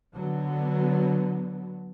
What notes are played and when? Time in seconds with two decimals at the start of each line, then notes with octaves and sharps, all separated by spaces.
0.14 D3 F#3 B3